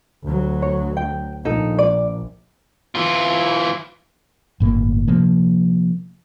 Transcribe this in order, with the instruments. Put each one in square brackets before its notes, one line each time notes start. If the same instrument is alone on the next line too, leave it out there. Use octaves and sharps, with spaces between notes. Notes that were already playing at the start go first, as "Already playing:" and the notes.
[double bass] D2 F#3
[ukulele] C#5
G5
[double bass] A#1 [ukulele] D#4 A4
[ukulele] D5
[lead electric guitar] E3 F4
[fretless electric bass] G1 A2 A#3
C3 F3 A#3